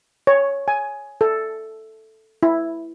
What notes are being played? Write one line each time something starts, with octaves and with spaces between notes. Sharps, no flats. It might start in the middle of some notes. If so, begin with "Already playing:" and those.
C#5
G#5
A4
E4